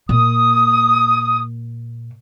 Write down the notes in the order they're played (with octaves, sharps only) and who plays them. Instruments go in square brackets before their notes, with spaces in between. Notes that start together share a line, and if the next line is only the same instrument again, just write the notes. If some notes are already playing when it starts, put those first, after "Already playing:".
[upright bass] A#2 [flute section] D#6